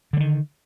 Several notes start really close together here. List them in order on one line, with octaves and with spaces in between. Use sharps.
D3 G3 D#3